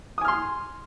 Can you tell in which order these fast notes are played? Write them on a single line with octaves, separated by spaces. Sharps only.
D#6 G#5 F6 C6